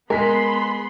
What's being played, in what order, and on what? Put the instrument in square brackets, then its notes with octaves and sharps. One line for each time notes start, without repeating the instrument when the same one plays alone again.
[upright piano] G#3 B6 [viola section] B3 B5 C6 [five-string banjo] A#4